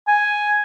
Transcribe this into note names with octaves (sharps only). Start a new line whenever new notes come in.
G#5